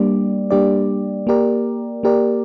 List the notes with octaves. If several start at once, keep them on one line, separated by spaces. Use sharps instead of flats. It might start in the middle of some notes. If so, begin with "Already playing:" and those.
Already playing: G3 A#3 D4 G4 D5
G3 A#3 D4 G4 D5
A#3 G4 A#4 D5
A#3 G4 A#4 D5